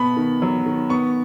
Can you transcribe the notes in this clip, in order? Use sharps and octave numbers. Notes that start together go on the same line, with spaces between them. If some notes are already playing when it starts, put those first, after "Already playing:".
Already playing: B2 B3 B5
D#3
F#3
D#3
B3 C#6